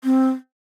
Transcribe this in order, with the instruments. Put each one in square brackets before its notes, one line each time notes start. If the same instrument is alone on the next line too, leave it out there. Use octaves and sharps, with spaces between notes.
[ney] C4